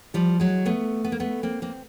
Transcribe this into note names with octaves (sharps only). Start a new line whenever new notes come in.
F3 G3
F#3 G#3
A3 B3
B3
A#3
A3 B3
A#3 C4
A#3 C4